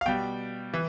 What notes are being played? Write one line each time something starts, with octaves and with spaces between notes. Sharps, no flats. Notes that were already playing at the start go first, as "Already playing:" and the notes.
F5
B2 G3 G5
E3